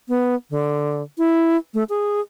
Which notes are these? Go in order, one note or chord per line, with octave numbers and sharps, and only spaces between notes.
B3
D3
E4
A3
G#4